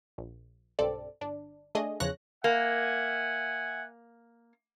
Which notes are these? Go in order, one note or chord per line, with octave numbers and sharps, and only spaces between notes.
A#1
B1 G2 C4 A4 D5
G1 D4
A3 D4 G#4 D#5
E2 C#3 F3 C#5 F#6 A#6
A#3 E5 F#5 G#5